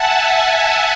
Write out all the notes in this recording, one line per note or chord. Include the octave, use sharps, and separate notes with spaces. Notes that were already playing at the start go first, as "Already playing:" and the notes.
Already playing: E5 F#5 G#5 A5
F#5 A5